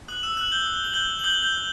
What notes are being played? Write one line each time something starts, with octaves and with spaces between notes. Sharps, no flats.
D#6 F#6 F#7
E6 E7
F#6 F#7
G6 G7
D#6
G7
F#7
F#6 G6 G7
F#7
D#6 G6 G7
G6 G7
F#6